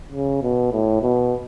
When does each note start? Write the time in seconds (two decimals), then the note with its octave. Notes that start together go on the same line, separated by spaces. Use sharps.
0.12 C#3
0.42 B2
0.72 A2
1.02 B2